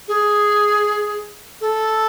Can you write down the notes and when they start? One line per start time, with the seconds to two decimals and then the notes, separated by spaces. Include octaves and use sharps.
0.08 G#4
1.61 A4